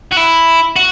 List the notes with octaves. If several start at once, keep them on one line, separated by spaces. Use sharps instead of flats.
F#4
E4
F#4